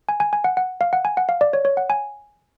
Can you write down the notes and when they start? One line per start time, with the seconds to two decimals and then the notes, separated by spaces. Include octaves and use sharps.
0.09 G#5
0.20 G#5
0.33 G#5
0.44 F#5
0.57 F#5
0.81 F5
0.93 F#5
1.05 G#5
1.17 F#5
1.29 F5
1.41 D5
1.53 C#5
1.65 C#5
1.77 F#5
1.90 G#5